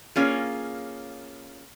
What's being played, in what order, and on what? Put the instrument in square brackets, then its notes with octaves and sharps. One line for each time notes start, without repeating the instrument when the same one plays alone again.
[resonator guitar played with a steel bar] A#3 C#4 F4 G#4